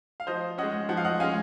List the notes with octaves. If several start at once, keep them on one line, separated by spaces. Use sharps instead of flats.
F5
F3 C5 D#5
G#3 C#4 D#5 F#5
F3 F#5
F5
D#5 F#5
G#3 C#4 F5 G#5